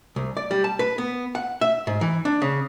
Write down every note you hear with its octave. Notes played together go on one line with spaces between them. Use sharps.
C2
D5
G3
A5
B4
B3
F#5
E5
G#2
E3
D4
C#3